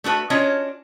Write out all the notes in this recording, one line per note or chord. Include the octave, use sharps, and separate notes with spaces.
A3 D4 F#4 B4
C#4 D4 F4 F#4 C#5 D#5